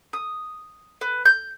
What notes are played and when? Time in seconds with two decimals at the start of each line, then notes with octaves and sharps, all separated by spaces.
0.13 D#6
1.01 B4
1.25 G6